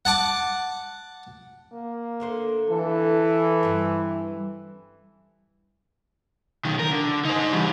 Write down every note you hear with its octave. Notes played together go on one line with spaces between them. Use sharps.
F#5 A5 D6
A#3
D2 D3 C5
E3 A4
G2 C4
B1 D#3
A#4
D3
D#4 C5
E3 G3